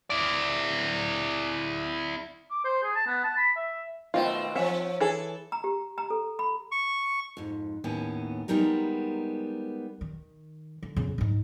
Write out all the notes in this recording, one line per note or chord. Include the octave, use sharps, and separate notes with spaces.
E4 D5
D6
C5
G#4
A5
B3
A5
B5
E5
B2 D#3 A3 B3 C4 F4
F3 C4 C#5 E5 F#5 G#5
E3 G#4 A4
A#5
G4
A#5
A4
B5
C#6
F2 G#2
D#2 A2 B3 C#4
G3 G#3 B3 D#4 A#4 A#5
D#3
D3
F2 C#3
G#2 D#4